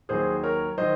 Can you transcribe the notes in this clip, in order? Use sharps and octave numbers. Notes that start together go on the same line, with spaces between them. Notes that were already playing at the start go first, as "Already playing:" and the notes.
D#2 D#3 F#3 G#4 C5
A#4 C#5
D#3 F#3 C5 D#5